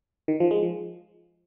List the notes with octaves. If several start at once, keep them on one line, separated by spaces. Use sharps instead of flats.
D#3
F3
G#3
F3